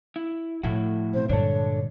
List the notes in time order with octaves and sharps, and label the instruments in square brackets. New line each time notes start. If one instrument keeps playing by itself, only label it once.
[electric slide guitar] E4
[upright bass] A2 F3 [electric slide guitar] A3 E4 F#4
[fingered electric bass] B2 C4 [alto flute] C5
[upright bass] G2 [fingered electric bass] A#2 D3 G#3 [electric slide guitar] D4 A4 [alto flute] C#5